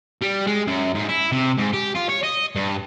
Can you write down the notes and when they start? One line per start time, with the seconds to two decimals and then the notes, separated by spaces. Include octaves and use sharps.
0.22 G3
0.47 G#3
0.68 F#2
0.95 G#2
1.09 E4
1.32 C3
1.58 G#2
1.73 G4
1.95 F4
2.09 C#5
2.23 D#5
2.55 G2